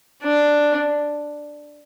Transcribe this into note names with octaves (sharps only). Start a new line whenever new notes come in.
D4